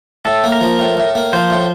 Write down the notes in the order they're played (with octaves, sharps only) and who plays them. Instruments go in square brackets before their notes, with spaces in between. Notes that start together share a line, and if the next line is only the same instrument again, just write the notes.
[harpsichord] A2 [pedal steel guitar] A4
[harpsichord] A#3
[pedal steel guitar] A#4
[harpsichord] F3
A2
A2
A#3
[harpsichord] F3 [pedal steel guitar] C5
[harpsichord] A2